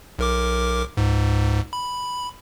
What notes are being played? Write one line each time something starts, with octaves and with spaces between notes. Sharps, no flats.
B1 A#4 D6
C#2 G#2
B5